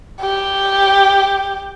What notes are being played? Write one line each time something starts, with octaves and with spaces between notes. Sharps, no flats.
G4